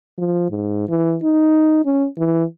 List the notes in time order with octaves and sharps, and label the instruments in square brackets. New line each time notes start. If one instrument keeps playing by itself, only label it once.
[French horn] F3
G#2
E3
D#4
C#4
E3